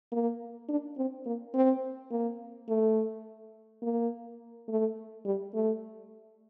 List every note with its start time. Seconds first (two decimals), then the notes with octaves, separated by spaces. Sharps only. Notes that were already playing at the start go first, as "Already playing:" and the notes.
0.12 A#3
0.69 D4
0.97 C4
1.26 A#3
1.54 C4
2.11 A#3
2.69 A3
3.83 A#3
4.68 A3
5.25 G3
5.54 A3